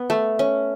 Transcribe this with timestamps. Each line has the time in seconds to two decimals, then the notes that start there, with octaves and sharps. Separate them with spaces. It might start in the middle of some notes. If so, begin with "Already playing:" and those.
Already playing: B3
0.10 A3
0.39 C#4